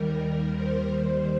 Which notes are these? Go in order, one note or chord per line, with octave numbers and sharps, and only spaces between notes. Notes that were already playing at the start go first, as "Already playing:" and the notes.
Already playing: D#2 D#3 G3 A#4
A#4
C5
D#2 D#3 G3